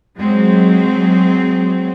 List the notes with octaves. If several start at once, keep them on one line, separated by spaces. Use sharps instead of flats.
F#3 G#3 C4